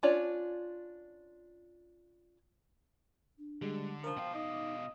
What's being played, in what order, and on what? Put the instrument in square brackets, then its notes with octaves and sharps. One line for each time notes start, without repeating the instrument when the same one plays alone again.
[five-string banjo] C#4 D4 F4 C#5 D5
[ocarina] D4
[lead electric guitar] D3 [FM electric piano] G3 G#3
[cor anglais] F3 [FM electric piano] A#4 C5
[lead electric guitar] B2 F5 [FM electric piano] G5
[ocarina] D#4 [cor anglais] D#5 [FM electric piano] D6